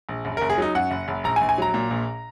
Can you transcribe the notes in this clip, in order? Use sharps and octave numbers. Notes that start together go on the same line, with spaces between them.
A#1
F#1
A#4
F#1
G#4
F#3 D#4
F#2 F#5
F#1
F#1
A#1 A#5
G#5
A#1
G#5
F#3 A#5
A#2
A#1